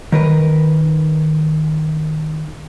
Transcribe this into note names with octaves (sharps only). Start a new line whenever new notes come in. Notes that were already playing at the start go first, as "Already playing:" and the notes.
D#3 A#4 B4